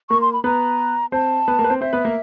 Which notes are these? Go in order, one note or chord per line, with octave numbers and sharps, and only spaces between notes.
A#3 A#4 C#6
C6
B5
B3 B4 A#5
C4 C5 A5
B3 B4
A#3 A#4
B4
C4 C5
C4 C5 E5
B3 B4
A#3 A#4